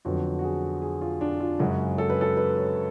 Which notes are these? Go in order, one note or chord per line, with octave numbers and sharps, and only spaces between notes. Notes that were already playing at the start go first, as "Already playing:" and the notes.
F2 D3 F#3 B3 F#4
F#4
G#4
G#4
F4
D4
F4
F#2 C#3 G#3 F#4
A4
B4
A4
B4
C#5